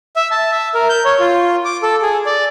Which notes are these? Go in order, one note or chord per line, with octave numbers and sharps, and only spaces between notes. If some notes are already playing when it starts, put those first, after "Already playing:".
E5
A5
E5
A#4
G6
C#5
F4
D6
A4
G#4
D5